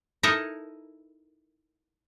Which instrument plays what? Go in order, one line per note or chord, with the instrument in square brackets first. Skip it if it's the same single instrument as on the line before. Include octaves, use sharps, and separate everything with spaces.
[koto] D#4 E4 A4 A#4 D#5 E5